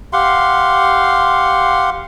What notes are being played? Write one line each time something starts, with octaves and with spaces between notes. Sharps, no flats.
G4 F5 F#5 C6